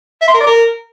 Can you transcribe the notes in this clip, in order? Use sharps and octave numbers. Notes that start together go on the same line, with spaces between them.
E5
C6
A#4
D5
A#4